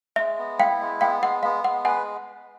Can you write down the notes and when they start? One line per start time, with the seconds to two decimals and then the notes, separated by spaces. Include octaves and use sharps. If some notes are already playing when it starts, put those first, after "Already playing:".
0.16 G#3 E5
0.38 B3
0.59 E4 F5 G5
0.81 G#3
1.01 B3 F5 G5
1.22 G#3 F#5
1.43 B3 F5
1.64 G#3 F#5
1.85 B4 F#5 G#5